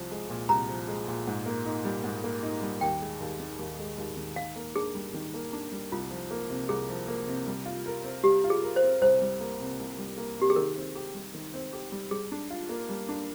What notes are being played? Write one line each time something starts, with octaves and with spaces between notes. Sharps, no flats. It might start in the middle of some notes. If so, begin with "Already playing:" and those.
Already playing: C2 F3
G#3
A#2
C2 A#5
F3
G#3
A#2
G#2
A#3
D#4
G3
G#2
A#3
D#4
G3
D#2 G5
G#3
D#2
D#3
D#2
G#3
D#2
D#3
D#3 F5
A#3
D4 G#4
G3
D#3
A#3
D4
G3
C2 F4
F3
A#3
C3
C2 G#4
F3
A#3
C3
G3
F4
A#4
C4
G3 G4
F4
G#4
A#4
C5
C4
C2 C5
G3
A#3
C3
C2
G3
A#3
C3 G4
G#4
D#3 A#4
C4
G4
G3
D#3
C4
G4
G3
G3 G#4
D4
F4
A#3
G3
D4